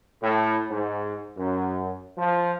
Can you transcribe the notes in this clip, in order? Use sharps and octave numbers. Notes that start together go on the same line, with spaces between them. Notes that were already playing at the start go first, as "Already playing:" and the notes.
A2
G#2
F#2
F3